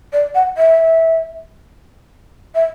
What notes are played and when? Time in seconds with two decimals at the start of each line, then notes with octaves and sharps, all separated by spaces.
0.13 D5
0.35 F#5
0.57 E5
2.55 E5